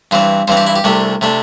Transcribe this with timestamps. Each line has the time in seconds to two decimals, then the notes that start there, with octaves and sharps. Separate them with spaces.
0.11 G2 E3 C4 C5
0.48 G2 E3 C4 C5
0.57 G4
0.67 E4
0.76 G4
0.84 C2 C3 A3 D4
1.21 C3 A3 D4